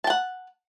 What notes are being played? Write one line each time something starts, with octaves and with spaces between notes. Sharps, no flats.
F#5 G5 A5